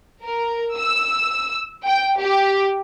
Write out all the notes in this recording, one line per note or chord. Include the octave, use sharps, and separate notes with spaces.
A#4
E6
G5
G4